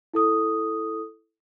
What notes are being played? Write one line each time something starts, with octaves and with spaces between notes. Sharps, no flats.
E4 A4 D#6